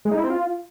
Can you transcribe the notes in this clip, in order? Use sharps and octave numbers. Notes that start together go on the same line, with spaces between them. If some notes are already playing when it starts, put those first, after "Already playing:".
G#3
D#4
E4
C4
F4